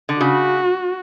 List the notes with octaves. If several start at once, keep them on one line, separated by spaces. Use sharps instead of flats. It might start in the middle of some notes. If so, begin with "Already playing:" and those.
D3
C#3 F#4